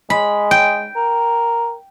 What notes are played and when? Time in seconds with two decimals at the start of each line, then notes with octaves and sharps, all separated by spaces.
0.10 G#3 B5
0.51 G5
0.96 A#4